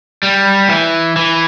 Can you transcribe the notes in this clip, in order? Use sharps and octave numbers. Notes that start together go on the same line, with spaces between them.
G3
E3
E3